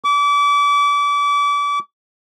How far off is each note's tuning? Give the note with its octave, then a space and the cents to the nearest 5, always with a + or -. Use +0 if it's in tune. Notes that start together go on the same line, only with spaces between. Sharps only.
D6 -35